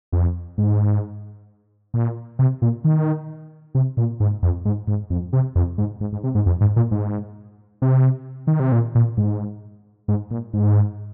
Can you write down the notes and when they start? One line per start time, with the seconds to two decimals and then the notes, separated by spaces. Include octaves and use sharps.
0.12 F2
0.58 G#2
1.94 A#2
2.39 C3
2.62 A#2
2.84 D#3
3.75 C3
3.97 A#2
4.20 G#2
4.42 F2
4.65 G#2
4.87 G#2
5.10 F2
5.33 C3
5.55 F2
5.78 G#2
6.01 G#2
6.13 G#2
6.24 C3
6.35 G#2
6.46 F2
6.61 G#2
6.76 A#2
6.91 G#2
7.82 C3
8.47 D#3
8.60 C3
8.72 A#2
8.95 A#2
9.17 G#2
10.08 G#2
10.31 A#2
10.53 G#2